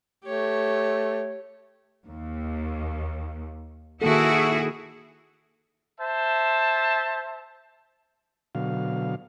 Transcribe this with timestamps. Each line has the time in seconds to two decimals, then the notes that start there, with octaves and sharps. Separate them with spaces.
0.25 A3 G4 C#5
2.07 D#2
4.02 D#3 A#3 E4 F#4 G#4 A4
5.99 C5 E5 A5
8.55 B2 D3 F#3 F5